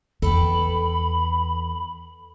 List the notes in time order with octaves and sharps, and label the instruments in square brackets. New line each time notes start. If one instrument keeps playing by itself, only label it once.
[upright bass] E2 [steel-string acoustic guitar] A4 B4 G5 [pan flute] B5